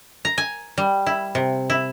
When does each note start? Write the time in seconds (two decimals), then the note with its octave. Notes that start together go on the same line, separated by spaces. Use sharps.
0.25 A#5
0.38 G#5
0.78 G3
1.06 E4
1.35 C3
1.70 E4